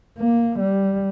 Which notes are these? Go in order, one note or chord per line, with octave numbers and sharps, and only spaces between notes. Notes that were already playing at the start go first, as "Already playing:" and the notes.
A#3
G3